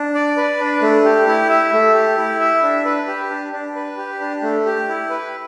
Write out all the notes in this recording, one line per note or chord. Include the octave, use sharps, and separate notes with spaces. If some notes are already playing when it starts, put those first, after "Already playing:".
Already playing: D4
D5
B4
D4
A3
G4
E4
E5
A3
G4
E4
E5
D4
B4
G4
D4
D4
B4
G4
D4
A3
G4
E4
B4